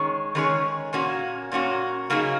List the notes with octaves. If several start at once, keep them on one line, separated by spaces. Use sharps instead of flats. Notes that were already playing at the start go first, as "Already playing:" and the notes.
Already playing: D#3 G#3 C#4 G#4 C#5
D#3 G#3 C#4 G#4 C#5
A#2 A#3 C#4 F#4
A#2 A#3 C#4 F#4
C#3 F#3 A#3 D#4 G#4